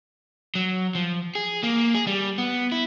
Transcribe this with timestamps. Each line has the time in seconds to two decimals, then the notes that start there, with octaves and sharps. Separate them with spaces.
0.55 F#3
0.95 F3
1.35 G#4
1.63 A#3
1.94 G#4
2.07 G3
2.38 B3
2.72 E4